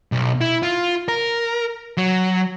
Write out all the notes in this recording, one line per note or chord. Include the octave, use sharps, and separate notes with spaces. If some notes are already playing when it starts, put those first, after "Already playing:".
B1
E4
F4
A#4
F#3